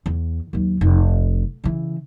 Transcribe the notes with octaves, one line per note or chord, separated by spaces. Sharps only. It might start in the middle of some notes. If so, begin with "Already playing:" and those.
E2
D#2 F#3
F1
C#3 E3